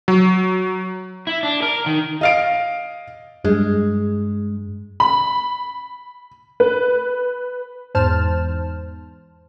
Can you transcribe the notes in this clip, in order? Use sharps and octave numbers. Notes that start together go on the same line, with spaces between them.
F#3
E4
D4
A#4
D#3
D#5 F5 D7
G2 G#3
B5
B4
E2 G#2 C5 A5 F6 E7